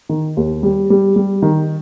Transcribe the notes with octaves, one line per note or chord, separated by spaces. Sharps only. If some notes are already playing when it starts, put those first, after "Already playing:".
D#3
D#2
G3
G3
G3
D#3